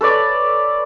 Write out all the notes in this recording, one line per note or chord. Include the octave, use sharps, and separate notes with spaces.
A4 B4 C#5 D5